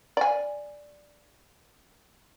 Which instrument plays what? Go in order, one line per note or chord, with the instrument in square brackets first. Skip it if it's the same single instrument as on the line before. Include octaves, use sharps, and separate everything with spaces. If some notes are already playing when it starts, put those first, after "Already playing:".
[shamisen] D5 G#5